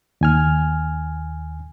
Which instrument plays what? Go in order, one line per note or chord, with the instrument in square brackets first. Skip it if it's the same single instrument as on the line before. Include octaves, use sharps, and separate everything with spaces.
[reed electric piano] D#2 G#5 F6